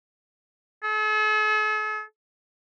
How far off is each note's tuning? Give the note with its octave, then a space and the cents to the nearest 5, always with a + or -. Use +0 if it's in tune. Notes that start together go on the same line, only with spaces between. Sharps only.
A4 -45